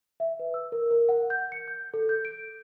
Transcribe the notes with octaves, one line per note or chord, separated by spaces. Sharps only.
E5
B4
E6
A#4
A#4
F#5
G6
C#7
G6
A4
G6
D7